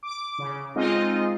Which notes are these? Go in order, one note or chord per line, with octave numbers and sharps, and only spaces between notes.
D6
C#3
G#3 C4 D#4 F4 D#5